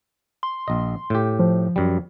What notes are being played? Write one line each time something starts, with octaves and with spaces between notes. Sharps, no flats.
C6
A#1 D#5
A2 G4
F3
F#2 G3